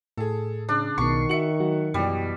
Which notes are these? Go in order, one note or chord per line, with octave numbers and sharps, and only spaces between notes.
A2 G#4 A4
C#3 D4
B1 B2 D#3 C#6 C7
F#4 E5 C#7 F#7
F#3 F#4
F#2 B2 E3 G3 D5